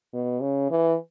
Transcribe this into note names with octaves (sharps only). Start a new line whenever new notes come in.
B2
C#3
E3